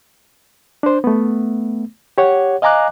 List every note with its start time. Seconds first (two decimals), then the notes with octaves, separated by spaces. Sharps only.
0.83 D4 C5
1.04 A3 B3
2.18 G4 C#5 F#5
2.62 D#5 F5 G#5 A#5 D6 F#6